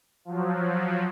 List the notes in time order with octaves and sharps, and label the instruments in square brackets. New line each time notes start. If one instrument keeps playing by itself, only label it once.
[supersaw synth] F3 F#3